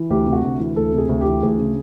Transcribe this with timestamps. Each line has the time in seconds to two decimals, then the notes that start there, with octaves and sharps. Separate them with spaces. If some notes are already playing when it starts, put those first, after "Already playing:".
Already playing: E3
0.10 D2 G4
0.27 C3
0.33 F#4
0.44 D2
0.59 E3
0.76 D2 A4
0.93 C3 G#4
1.09 D2
1.21 G4
1.26 E3
1.42 D2 G#4
1.59 C#3